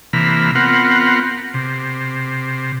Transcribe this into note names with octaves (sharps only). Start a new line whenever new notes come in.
C3 E3 A#3 B5 F6
B3 C4 F4 A#4 F#5
C3